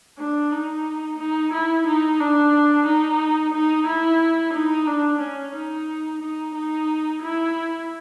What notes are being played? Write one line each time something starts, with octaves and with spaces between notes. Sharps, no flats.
D4
D#4
D#4
E4
D#4
D4
D#4
D#4
E4
D#4
D4
C#4
D#4
D#4
D#4
E4